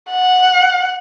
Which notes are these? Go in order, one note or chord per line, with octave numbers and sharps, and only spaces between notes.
F#5